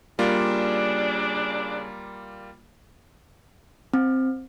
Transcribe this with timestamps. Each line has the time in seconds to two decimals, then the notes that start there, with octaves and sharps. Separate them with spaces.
0.19 C#3 G3 A#3 D4 F4
3.94 C4